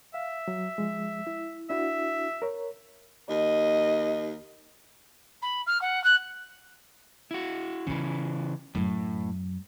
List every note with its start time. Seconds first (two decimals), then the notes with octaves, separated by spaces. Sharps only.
0.14 E5 F5
0.48 F#3
0.78 F3 G#3
1.27 E4
1.70 D4 E4 F#4 E5
2.42 A#4 C#5
3.30 D#2 D#5
5.42 B5
5.66 F6
5.81 F#5
6.04 F#6
7.31 E4 F#4
7.87 C#3 E3 C#4 F4
8.75 F#2 A2 F#3